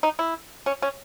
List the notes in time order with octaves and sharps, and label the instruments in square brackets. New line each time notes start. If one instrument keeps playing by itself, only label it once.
[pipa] D#4
E4
C#4
C#4